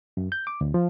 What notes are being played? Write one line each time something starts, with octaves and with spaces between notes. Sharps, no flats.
F#2
G6
D6
D2
F3